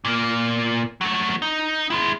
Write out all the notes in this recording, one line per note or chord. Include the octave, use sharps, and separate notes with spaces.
A#2 A#3
F#3 A3
D#4
G#3 E4